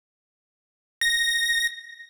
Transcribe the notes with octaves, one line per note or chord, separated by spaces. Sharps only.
A#6